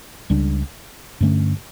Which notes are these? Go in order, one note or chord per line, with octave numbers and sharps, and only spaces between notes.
C#2 C#3 G3 D4
G2 D3 A3 C#4